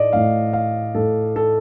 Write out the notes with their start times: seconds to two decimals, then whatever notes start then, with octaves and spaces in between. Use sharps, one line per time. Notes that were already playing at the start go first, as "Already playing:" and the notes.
Already playing: A2 A3 D5 D#5
0.13 A2 A3 F5
0.53 F5
0.95 A2 A3 A4
1.36 A4